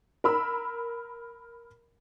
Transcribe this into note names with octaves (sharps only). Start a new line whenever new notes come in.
A#4 B5 E6